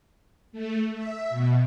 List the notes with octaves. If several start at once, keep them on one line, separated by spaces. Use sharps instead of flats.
A3
E5
B2